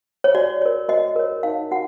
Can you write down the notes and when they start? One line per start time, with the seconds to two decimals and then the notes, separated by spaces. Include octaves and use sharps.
0.24 C#5
0.35 F#4 D5
0.62 A#4 C#5
0.88 F#4 D#5
1.16 A#4 C#5
1.43 D#4 F5
1.72 F#4 F#5